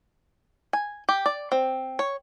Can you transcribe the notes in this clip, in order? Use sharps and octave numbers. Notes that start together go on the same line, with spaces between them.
G#5
G4
D5
C4
C#5